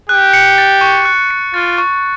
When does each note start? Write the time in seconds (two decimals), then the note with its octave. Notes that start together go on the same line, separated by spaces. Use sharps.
0.09 G4 F#6
0.33 C#7
0.58 A6
0.81 C#6
1.05 F#6
1.31 C#7
1.54 F4 A6
1.78 C#6